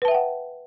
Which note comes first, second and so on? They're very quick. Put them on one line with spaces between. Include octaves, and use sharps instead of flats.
B4 A5 E5 G5 F#5